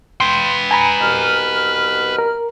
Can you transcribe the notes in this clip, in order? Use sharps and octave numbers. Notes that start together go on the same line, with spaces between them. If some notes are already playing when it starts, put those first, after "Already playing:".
B4 G5 C6
G#5 A#5 B5
C2 B2 F6
A#4